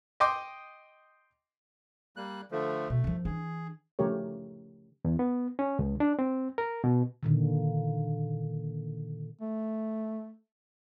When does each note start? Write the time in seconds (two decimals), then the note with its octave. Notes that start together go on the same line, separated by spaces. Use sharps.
0.20 D#5 G5 C6 D6
2.17 G3 A#3 F#6
2.51 D3 F3 A3
2.90 B2 A3
3.04 F#2 F3
3.25 E3 D4 G#4
3.99 C#3 F3 A3 G4 A#4 C#5
5.05 E2
5.19 B3
5.59 C#4
5.79 C#2
6.00 D4
6.19 C4
6.58 A#4
6.84 B2
7.23 A#2 D3 D#3
9.41 A3